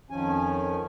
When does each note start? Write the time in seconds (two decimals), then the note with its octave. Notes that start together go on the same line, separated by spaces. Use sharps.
0.10 F2 D#3 F3 C#4 G#5